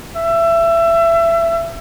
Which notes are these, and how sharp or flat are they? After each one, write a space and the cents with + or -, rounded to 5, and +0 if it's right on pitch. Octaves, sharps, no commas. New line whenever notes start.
E5 +25